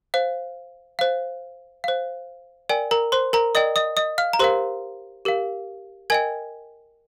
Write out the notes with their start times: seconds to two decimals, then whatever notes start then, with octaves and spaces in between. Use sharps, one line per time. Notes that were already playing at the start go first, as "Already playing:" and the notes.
0.14 C5 F5
0.99 C5 F5
1.84 C5 F5
2.69 A#4 D5 G5 G#5
2.91 A#4 A#5
3.12 C5 C6
3.33 A#4 A#5
3.55 A#4 D5 D#5 G5 D#6
3.76 D#5 D#6
3.97 D#5 D#6
4.18 F5 F6
4.33 A#5
4.39 G4 A#4 C5 F5 C6
5.25 G4 A#4 F5
6.10 A#4 D#5 G5 G#5 G#6